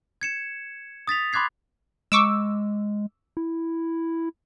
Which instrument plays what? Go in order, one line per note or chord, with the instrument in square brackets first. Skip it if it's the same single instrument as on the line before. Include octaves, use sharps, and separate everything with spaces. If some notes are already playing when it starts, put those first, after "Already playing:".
[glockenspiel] G#6 C#7 E7
D#6 A6 B6 F7
B5 C6 D6 F#6 G#6 C7
[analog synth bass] G#3 [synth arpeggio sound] C#6 D6 E6
[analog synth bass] E4